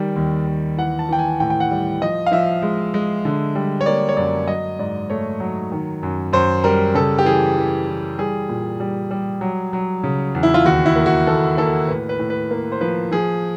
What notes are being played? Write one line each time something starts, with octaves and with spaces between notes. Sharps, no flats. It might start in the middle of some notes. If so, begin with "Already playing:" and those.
Already playing: D#3 G3
D#2
D#2
E3 F#5
A5
E3 G5
G#5
A2 G5
G5
F#5
G3
F3 D#5
F5
F3 E5
G#3
G#3
D3
G3
C#5
A#3 D5
C#5
F#2 D5
F#3 D#5
G#2 D5
A3 C#5
F#3
D#3
F#2
F#2 C5
G3 A#4
C#3 A4
G4
E3 G#4
E3
E3
G3 G#4
A#2
G3
G3
F#3
F#3
C#3
E2
E4
F4
D#2 F#4
E4
A#3
F#4
D#2 A4
A#3 A4
A2 B4
B4
A2
B4
A#3
C5
F3 B4
F3 G#4